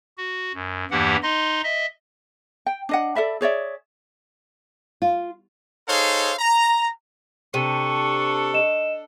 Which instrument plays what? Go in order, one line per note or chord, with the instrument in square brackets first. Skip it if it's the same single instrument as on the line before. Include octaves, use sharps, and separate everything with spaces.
[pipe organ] F#4
F#2
E2 G2 E3 A#3 G4 F#5
D#4 D#5 C6
D#5 E5
[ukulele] G5
D4 D#5 F#5
A4 D5 E5 B5
G#4 C#5 D5 E5
[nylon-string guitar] F4
[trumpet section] D#4 G#4 A4 C5 C#5 F5
A#5
[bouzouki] C3 [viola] D4 A4 [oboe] C#6 [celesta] D#7
[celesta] D#5 E7